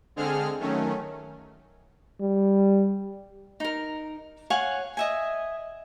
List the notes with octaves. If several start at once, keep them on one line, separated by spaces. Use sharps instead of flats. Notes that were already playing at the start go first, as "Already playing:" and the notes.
D3 G#3 C4 G#4 A4 F6
D#3 F#3 A3 C#4
G3
D#4 A#4
C#5 F5 F#5 G#5
D#5 E5 G#5